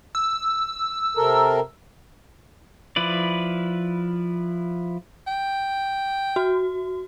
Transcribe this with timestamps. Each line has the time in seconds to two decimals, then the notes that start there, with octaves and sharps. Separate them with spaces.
0.15 E6
1.17 C3 A4 A#4
2.96 F3 E4 B4 D5
5.27 G5
6.36 F#4